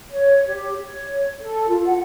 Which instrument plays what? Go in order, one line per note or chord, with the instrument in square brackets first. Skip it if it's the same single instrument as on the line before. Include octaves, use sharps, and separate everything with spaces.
[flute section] C#5
G4
C#5
A4
F4
F#5